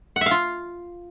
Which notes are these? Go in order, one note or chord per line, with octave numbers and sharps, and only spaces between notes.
F#5
E5
F5
F4